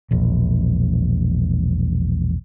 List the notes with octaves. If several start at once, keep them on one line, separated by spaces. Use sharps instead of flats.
E1 A#1